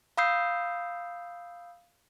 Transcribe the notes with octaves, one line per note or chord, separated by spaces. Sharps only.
F5 B5 D#6 E6 G6 C7